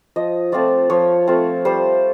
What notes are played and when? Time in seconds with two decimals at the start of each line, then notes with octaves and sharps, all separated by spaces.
0.16 F3 D#5
0.52 A3 C4 F4 D5
0.90 F3 C#5
1.27 A3 C4 F4
1.65 G3 C5